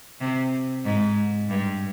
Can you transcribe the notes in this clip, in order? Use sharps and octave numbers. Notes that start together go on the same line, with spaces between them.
C3
G#2
G2